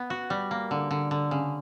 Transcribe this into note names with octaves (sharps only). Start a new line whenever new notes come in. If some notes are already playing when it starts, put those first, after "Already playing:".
Already playing: B3
F#4
G3
A#3
D3
D3
D3
C#3